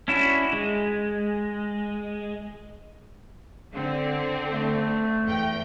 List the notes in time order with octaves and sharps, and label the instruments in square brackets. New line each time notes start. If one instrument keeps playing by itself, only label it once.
[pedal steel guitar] C#4 D4 E4 F#4
G#3
[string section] D3 C4
[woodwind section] A3
[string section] E2 G5